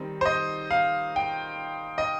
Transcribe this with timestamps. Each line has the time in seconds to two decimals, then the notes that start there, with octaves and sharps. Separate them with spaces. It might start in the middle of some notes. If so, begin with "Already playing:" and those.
Already playing: D#3 G3 C4 D#4
0.21 C5
0.25 D#5
0.71 F5
1.16 G5
1.98 D#5